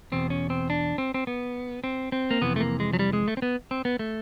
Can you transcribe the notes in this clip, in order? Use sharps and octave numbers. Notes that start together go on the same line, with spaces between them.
E2 B2 C4
C#4
C4
D4
C4
C4
B3
C4
C4
A#3
F2 C3 E3 B3
A3
A#3
G#3
F#3
G3
G#3
A3
C4
B3
C4
B3
A3